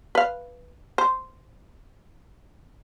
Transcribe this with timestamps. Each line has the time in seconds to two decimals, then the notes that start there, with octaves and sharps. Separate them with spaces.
0.15 B4 F5
0.98 C5